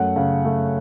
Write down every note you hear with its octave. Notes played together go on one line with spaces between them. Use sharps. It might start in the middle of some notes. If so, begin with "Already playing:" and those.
Already playing: F#2 A3 F#5
C#3
A3